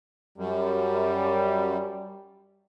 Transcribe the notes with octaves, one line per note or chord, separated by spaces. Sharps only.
F#2 G3